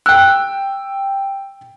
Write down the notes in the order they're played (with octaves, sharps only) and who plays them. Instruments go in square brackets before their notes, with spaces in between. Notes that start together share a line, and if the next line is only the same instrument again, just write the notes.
[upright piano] G5 E6 [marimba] F#6